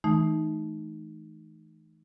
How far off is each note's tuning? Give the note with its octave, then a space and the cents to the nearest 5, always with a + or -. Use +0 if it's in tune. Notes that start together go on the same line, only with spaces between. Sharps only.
E3 -25 A3 -35 D#4 -5